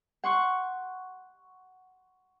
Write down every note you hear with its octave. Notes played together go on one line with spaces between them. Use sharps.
F#5 C6 C#6